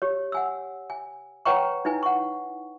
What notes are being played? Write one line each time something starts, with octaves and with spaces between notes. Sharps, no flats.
G4 C#5
F#5 G#5 E6
G#5
B4 C#5 F#5 G5 A#5 C#6
D#4 E4 B4 G#5
F#5 C#6